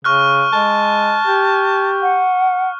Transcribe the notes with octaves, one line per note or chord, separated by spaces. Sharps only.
C#3 C#6 F6 F#6
G#3 A5
G4
F#5